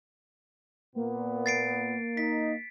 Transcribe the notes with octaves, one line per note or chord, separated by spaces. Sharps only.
A#2 A#3 B3
A6 C7 D7
D#4 B6